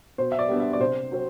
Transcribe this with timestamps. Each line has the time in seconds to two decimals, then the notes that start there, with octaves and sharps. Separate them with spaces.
0.18 B2 C5
0.32 E5
0.39 D5
0.49 G3 B3 D4
0.60 E5
0.73 D5
0.80 C3 C5
1.11 F#3 C4